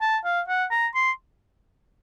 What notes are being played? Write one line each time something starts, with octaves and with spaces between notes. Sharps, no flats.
A5
F5
F#5
A#5
C6